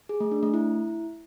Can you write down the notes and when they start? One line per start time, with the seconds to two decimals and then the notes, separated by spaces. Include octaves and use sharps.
0.09 G#4
0.20 A3
0.32 D4
0.43 A3
0.54 E4